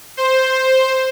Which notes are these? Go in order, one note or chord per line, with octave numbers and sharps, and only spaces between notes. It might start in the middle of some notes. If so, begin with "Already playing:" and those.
C5